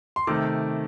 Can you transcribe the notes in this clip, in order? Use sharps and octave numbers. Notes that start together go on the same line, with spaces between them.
C6
C3 D#3 A3 D6